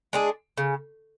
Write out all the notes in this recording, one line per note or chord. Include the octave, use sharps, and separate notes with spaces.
G#3 D4 G#4
C#3